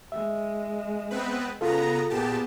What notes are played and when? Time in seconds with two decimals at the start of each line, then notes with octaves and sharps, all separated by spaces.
0.12 G#3 E5
1.11 B3 C4 B4
1.61 C#3 B3 F4 A4 A#5
2.10 A#2 B3 G4 G#4 A5